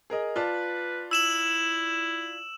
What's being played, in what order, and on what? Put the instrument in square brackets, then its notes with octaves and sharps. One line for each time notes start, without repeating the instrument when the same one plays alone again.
[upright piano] G#4 A#4 D#5
[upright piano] F4 D5 A5 [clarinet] B4
[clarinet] E4 [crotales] E6 E7 F#7